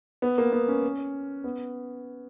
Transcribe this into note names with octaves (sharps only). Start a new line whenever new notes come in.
B3
A#3
B3
C#4
B3